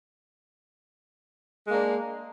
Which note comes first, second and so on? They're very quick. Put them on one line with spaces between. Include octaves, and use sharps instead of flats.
G#3 A#3 D4